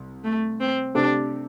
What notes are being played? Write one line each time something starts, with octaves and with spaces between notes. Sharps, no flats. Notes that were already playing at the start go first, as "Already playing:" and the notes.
Already playing: C2
A3
C4
C3 A3 C4 D4 G4